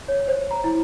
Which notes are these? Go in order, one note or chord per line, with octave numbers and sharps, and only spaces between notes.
C#5
C5
A#5
E4